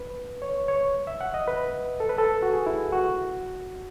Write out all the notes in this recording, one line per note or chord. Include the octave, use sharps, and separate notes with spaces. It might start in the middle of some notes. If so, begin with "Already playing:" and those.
Already playing: B4
C#5
C#5
E5
F#5
D#5
B4
A4
B4
A4
F#4
G#4
E4
F#4